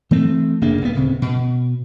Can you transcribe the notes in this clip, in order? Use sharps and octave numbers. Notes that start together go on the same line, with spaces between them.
E3 A3 C4
F#1 C#3 A#3 D4
D#1 A2 B3
D1 C#3 C4
B2